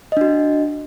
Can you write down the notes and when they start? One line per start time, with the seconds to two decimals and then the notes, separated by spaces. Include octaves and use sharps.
0.12 D#5
0.17 D4
0.21 F#4